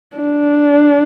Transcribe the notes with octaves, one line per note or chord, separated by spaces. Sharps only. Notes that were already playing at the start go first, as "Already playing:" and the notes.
D4